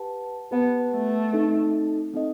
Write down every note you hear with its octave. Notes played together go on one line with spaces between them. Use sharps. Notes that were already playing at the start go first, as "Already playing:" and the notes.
Already playing: G4 B4 F#5 A5
B3 G4 B4 F#5 A5
A3
C4 D#4 A4 D#5
C4 D#4 A4 D#5